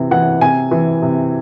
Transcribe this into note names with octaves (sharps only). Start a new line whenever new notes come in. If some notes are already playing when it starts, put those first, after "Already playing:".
Already playing: C3 E3
E3 F#5
C3 G#5
E3
C3